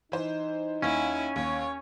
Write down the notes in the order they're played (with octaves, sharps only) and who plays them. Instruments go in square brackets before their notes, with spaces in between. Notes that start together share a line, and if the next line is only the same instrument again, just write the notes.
[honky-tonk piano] E3 C5 [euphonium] D#4
[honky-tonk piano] D#2 [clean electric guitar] C#4 [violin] E4 G#5
[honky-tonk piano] D#2 [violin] C#5